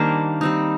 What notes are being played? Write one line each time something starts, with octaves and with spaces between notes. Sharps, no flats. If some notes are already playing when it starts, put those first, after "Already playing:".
Already playing: D#3 G3 A#3 D4 C5
G3 C4 D#4